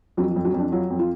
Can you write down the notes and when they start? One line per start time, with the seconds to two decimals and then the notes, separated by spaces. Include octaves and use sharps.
0.17 F2 F#3
0.31 F3
0.36 F2
0.45 F#3
0.54 F2 D4
0.72 F#3 F4
0.90 F2
0.99 F4